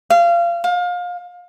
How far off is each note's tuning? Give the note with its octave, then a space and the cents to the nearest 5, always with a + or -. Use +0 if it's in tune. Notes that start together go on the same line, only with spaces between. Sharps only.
F5 -25
F5 +30